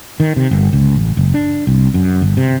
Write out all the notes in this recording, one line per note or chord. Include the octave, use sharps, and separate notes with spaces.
D#3
C3
G1
C#2
A1
F#1
D4
C2
F#2
G1
C3